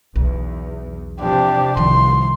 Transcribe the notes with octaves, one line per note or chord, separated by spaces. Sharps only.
B1 E2
C3 F3 D4 G4
C2 D#3 F3 C6